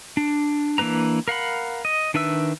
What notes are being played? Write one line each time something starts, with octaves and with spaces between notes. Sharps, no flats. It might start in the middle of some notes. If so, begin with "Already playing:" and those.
D4
E3 A#3 D4 B4 A#5
A#4 F5 F#5 B5
D#5
D#3 D4 B4 E5 E6